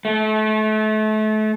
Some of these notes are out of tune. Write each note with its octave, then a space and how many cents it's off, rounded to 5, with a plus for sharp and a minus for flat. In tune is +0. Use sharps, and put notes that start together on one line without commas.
A3 -30